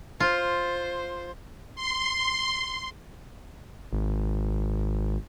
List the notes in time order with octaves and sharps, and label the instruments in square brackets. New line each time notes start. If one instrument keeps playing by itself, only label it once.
[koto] F4 [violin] C5
[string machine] C6
[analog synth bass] G#1